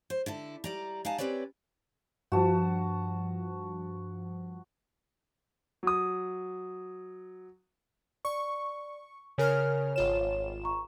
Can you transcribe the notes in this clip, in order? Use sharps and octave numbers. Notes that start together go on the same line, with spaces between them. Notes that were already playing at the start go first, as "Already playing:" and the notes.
C5
D3 E4 A4
G3 D5 A#5
D#4 F5 F#5 G#5 A5
C4 G4 B4 C#5 D5
G2 F3 F#4 A5
F#3 D#6
D5 C#6
C#3 A#4 C#5 G#5 F6
G#1 F4 C#5 E7
A#5 C#6